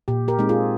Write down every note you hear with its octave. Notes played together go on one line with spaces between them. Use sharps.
A#2 G4
G4 A#4
G#3 C4 D#4
F4 G#4